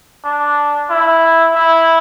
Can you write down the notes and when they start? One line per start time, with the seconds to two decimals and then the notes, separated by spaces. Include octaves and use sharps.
0.25 D4
0.90 E4
1.55 E4